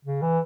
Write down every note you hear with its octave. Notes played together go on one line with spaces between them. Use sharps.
C#3
E3